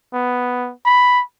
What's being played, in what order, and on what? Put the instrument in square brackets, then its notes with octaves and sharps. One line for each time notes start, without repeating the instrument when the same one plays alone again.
[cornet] B3
B5